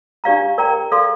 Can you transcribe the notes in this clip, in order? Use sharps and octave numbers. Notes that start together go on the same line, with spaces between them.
D4 G4 D5 F5 A#5
A#4 D5 G5 A#5
A4 D5 F5 C6